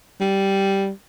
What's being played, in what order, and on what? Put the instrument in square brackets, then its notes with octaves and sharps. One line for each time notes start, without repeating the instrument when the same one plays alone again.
[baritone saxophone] G3